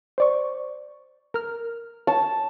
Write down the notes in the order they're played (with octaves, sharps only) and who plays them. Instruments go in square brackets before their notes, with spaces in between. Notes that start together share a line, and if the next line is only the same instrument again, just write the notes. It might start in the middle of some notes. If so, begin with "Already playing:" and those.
[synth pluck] C5 D5 C#6
A#4 F6
[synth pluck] C#5 [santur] A5